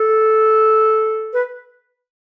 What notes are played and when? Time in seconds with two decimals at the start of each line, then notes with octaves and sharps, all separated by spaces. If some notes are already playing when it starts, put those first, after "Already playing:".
Already playing: A4
1.34 B4